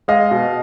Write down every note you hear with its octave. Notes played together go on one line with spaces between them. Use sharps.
G#3 D#5 F5
B2